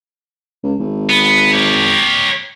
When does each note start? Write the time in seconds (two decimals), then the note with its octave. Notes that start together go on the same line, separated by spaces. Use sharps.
0.63 C#2
0.79 G#1
1.09 B3
1.52 G4 C#5